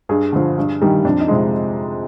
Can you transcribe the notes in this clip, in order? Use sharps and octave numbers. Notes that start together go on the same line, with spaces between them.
G2 G#4
D3 F3
G2
D#3 G3
F2 D4
D#4
C3 F3 G#3